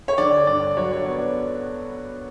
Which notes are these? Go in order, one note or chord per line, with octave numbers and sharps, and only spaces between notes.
C#5
D3 D5
G2 D5
F#3 C#5
C#5
B3 D5